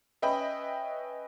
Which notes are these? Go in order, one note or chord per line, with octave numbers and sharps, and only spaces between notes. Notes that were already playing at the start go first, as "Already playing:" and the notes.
C#4 B4 D#5 E5 G5 B5